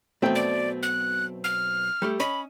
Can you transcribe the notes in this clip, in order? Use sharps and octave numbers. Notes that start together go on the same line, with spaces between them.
B1 B2 A3 C4 G5
D5
F#6
F6
G3 A3 G4
C#4 D#5 B5